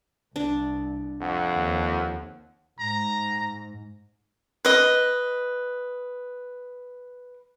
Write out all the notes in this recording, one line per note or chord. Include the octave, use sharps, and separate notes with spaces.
C2 D4
F2 F#5
D#2
G#2 A#5
B4 D#5